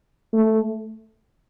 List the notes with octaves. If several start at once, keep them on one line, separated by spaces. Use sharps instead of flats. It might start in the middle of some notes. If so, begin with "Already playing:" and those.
A3